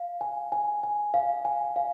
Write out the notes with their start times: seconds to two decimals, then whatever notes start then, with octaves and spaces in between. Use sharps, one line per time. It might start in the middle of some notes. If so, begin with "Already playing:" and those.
Already playing: F5
0.21 G#5
0.52 G#5
0.83 G#5
1.14 F5
1.45 G#5
1.76 F5